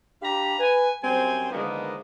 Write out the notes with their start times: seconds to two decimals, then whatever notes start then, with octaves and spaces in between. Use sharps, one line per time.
0.22 D4 G4 F5 A#5 B5
0.60 B4 G#5
1.04 F#2 G3 C4 C5 G#5
1.52 D3 D#3 F3 G#3 A#3 B3